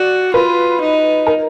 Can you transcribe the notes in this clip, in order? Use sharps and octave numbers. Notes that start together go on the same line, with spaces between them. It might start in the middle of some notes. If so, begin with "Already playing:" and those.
Already playing: F#4 D5
F4 B4
D#4
A#4